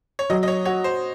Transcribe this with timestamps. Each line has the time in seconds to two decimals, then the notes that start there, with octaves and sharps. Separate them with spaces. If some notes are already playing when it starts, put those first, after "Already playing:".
0.19 C#5
0.30 F#3 D#5
0.43 D#5
0.48 C#5
0.65 F#4 C#5
0.84 C5